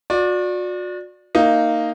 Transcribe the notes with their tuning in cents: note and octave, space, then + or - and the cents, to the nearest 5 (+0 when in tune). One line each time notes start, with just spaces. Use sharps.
F#4 -40 D5 +5
A#3 -15 D#4 +0